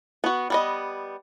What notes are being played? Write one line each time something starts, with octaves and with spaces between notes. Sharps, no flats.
B3 F#4
G3 B3 D#5